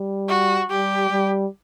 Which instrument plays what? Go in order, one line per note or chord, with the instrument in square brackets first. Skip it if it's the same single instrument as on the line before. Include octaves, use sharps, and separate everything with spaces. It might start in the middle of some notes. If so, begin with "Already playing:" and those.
Already playing: [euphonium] G3
[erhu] F#4
[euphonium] G3 [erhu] G4
[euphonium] G3